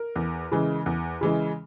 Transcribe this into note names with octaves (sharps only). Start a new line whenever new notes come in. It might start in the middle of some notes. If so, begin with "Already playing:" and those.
Already playing: A#4
E2
C#3 E3 G#3
E2
C#3 E3 G#3